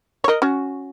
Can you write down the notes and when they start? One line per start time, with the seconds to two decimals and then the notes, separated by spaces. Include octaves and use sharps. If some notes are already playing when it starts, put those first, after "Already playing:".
0.24 C#5
0.28 A#4 D#5
0.42 C#4 F#4